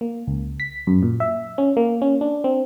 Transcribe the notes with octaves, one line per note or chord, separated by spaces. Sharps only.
A#3
C#2
B6
F#2
A#2
E5
C#4
A#3
C#4
D4
C4